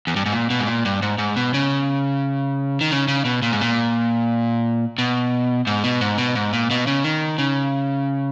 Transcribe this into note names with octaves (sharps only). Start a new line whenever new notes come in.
E2
G2
G#2
A#2
B2
G#2
A#2
G2
G#2
G#2
B2
C#3
D#3
C#3
C#3
B2
A#2
G#2
A#2
B2
G#2
B2
G#2
B2
G#2
A#2
B2
C#3
D#3
C#3